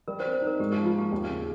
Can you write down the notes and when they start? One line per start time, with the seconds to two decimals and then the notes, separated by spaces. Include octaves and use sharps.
0.08 G3 A#4
0.20 C5
0.25 C4
0.33 C5
0.42 D#4
0.47 A#4
0.59 G#2 G4
0.73 G4
0.78 F3
0.85 F4
0.94 A#3 G4
1.12 D#2
1.29 C#3